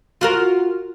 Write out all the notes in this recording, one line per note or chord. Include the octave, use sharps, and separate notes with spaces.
F4 F#4 A#4